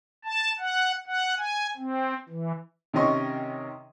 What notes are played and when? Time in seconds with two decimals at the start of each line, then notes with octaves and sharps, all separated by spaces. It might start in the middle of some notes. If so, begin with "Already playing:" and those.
0.25 A5
0.60 F#5
1.07 F#5
1.38 G#5
1.77 C4
2.29 E3
2.93 C3 D#3 C#4 D#5 C6 C#6